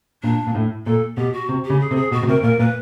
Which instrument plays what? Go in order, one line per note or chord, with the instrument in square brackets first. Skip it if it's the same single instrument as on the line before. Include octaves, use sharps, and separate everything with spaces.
[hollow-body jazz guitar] A#2 [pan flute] D4
[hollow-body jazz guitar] A#2
A2
[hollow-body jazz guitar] A#2 [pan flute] A4
[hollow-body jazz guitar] B2 [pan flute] G4
[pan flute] F#4
[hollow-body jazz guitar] C3
[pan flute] G4
[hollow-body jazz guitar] C#3
[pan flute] G#4
[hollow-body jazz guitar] C3 [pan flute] A4
[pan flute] G#4
[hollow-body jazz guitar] B2 [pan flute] F#4
[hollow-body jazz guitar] B2
[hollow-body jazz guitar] C3 [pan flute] A#4
[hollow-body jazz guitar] A#2 [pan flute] A#4
[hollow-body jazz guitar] A#2 [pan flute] B4